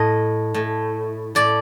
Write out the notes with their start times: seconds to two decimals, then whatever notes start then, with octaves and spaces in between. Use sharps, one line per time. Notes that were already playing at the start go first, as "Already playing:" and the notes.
Already playing: A2 D#5
0.54 A2
1.35 A2 D5